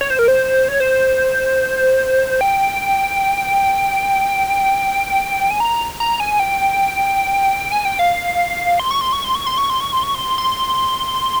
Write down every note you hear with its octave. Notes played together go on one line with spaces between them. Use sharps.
C#5
C5
A#4
C5
C#5
C5
G5
G#5
A#5
A#5
G#5
G5
G#5
G5
F5
C6
C#6
C6
C#6
C6
C#6
C6
C#6
C6
C#6
C6
C#6
C6
C6